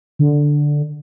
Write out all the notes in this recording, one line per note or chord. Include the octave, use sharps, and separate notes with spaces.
D3